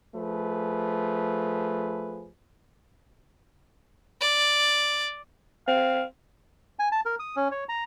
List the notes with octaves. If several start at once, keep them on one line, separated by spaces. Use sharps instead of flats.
F3 A3 G#4 B4
D5
C4 F5
G#5
A5
A#4
D#6
C#4
C#5
A#5